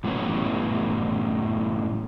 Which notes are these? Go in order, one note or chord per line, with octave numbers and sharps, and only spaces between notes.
F#2 A2 E3 G3 B3 C#4